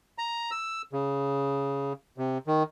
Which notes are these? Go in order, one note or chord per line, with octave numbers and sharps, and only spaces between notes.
A#5
E6
C#3
C3
D#3